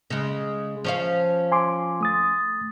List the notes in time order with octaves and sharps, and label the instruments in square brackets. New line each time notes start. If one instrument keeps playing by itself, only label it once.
[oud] C#3 G#3
F3 C#4 F5
[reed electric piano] G#5 C6 D6
A3 D#6 A6